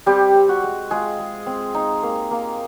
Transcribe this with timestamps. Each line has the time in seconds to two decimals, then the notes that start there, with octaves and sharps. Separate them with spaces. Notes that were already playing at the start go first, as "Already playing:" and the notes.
0.06 G3 C4 G4
0.35 C4
0.49 F#4
0.63 G#3
0.91 G#3 F4 G#4
1.19 G#3
1.46 C4
1.75 D#4
2.03 A#3
2.31 A#3